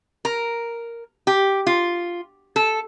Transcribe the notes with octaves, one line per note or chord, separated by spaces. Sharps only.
A#4
G4
F4
A4